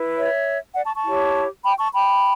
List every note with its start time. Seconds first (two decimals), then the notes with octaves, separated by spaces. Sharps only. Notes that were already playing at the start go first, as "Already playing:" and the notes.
Already playing: E4 B4
0.17 C#5 E5
0.75 D5 F#5
0.85 A5 C#6
0.95 A5 C#6
1.05 E4 G4 C#5
1.64 G5 B5
1.79 A5 C#6
1.93 G5 B5